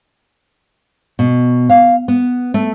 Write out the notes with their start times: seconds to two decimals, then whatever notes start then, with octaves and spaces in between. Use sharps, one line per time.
1.19 B2
1.70 F5
2.08 B3
2.54 A3